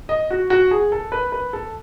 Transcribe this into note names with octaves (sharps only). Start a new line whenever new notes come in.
D#5
F#4
F#4
G#4
A4
B4
B4
A4